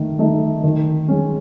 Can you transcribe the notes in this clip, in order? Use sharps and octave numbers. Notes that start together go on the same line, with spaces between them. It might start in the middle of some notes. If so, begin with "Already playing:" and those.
Already playing: D#3 A3 D#4
A3 D#4
D#3
G#3 C#4